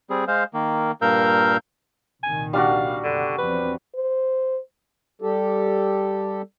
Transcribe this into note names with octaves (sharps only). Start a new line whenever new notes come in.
G3 C4 G#4
G#3 C5 F5
D#3 A#3
G2 A#2 A#4 F5 E6 G6
C2 A#2 D#3 G#5
G3 D4 F#4 F5
F#1 B2 D3
E2 F3 C4 B4
C5
G3 G4 A4